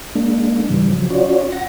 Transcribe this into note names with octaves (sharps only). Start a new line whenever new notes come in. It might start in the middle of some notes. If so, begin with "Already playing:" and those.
G#3 A#3 D4
G#2 C#3 E3 G3
C#3 F3 F#3
C#4 F4 F#4 C#5 D5
F#5 A#6